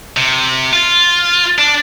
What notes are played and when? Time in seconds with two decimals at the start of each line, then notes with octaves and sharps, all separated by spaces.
0.17 C3
0.73 F4
1.58 D4